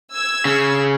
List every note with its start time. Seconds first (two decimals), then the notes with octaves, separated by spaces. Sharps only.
0.14 E6 G#6
0.45 C#3